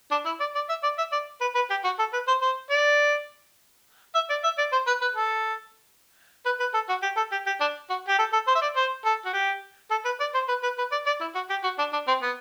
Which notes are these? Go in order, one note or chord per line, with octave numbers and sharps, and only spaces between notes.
D4
E4
D5
D5
E5
D5
E5
D5
B4
B4
G4
F#4
A4
B4
C5
C5
D5
E5
D5
E5
D5
C5
B4
B4
A4
B4
B4
A4
F#4
G4
A4
G4
G4
D4
F#4
G4
A4
A4
C5
E5
D5
C5
A4
F#4
G4
A4
B4
D5
C5
B4
B4
B4
D5
D5
E4
F#4
G4
F#4
D4
D4
C4
B3